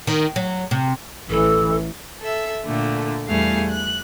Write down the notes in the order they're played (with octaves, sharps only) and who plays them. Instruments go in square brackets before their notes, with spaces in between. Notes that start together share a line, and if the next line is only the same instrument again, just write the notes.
[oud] D#3
F#3
C3
[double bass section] A1 E3 [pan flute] A4
[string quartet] A4 E5
A#2 D3 A3
E2 G3 A3 G#4 F5
F#6